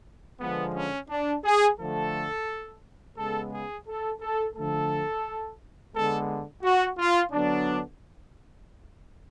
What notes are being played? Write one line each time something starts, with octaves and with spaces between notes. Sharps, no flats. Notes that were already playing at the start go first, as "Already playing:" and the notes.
D3 F3 G#3 B3
C#4
D4
G#4
D3 F3 A3 A4
C#3 G#3 B3 A4
G#4
A4
A4
D3 F3 A3 A4
D3 G#3 B3 A4
F#4
F4
D3 F#3 B3 D4